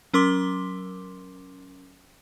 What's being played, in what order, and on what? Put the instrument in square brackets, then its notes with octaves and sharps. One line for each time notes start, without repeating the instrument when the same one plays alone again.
[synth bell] F#3 C#4 A#4 C6 D6 G7